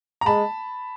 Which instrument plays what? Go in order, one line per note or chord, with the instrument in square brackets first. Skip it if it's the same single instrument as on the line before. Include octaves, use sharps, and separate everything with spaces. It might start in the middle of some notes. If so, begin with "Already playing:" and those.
[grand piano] A#5
[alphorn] G#3 [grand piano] A5 B5